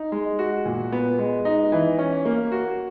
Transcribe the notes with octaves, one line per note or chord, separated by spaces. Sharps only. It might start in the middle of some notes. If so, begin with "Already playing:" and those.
Already playing: D#4
G#3
F#4
A#2
B3
G#3
D#4
E3
C#4
A#3
F#4